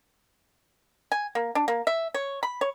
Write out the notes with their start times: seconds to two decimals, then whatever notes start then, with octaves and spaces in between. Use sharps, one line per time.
1.12 G#5
1.35 A#3
1.55 D4
1.68 A#3
1.87 E5
2.14 C#5
2.43 B5
2.61 C#5